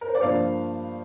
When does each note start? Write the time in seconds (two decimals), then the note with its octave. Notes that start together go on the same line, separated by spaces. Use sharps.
0.01 A#4
0.08 C5
0.15 D5
0.22 G2 F3 A#3 C5 F5